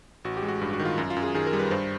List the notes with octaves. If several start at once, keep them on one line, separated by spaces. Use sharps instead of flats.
A1 F#4
G4
G#3
F#4
G2
F#4
D#3
F4
F#2
F4
F#2
G#4
D#3 G#4
A#4
G3
B4
G2 C5